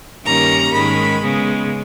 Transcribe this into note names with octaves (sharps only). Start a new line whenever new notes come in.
G2 D#3 G3 A#3 C#4 A#5
G#2 D#3 G#3 C#4 B5
C#3 G#3 B3